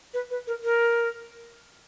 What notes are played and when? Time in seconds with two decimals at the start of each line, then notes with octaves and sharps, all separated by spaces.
0.14 B4
0.31 B4
0.47 A#4
0.64 A#4